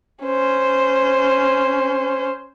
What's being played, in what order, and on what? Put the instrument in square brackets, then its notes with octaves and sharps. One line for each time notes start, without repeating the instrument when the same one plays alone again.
[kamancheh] C#4 C5